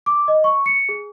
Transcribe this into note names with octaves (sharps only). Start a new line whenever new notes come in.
D6
D#5
C#6
C#7
G#4